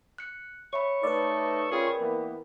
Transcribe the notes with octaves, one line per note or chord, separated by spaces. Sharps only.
F#6 C#7
C#5 E5 B5 C#6
A3 D#4 A4 B4 D5
C#4 F4 G#4 A#4 G5 B5
E3 A#3 B3